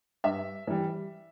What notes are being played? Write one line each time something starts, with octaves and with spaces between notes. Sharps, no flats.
G2 E5
E3 G3